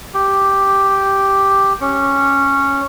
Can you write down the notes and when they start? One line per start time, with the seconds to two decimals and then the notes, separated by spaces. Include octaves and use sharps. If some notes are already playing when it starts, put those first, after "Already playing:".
0.14 G4
1.81 C#4